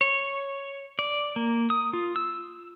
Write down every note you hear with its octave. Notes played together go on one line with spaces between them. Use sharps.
C#5
D5
A#3
D#6
F4
E6